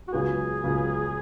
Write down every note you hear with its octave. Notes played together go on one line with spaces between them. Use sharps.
F#4
C#2 C#3 F#3 B3 G#4
C#2 C#3 F#3 B3